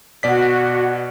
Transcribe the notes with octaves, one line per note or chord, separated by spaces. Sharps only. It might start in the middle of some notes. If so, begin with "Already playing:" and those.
B2 F#4 D5 B6